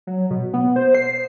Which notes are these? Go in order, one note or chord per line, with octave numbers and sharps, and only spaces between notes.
F#3
B2
B3
C5
C7